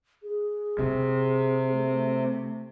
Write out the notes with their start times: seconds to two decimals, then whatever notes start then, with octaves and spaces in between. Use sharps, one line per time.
0.23 G#4
0.79 C3
1.72 A3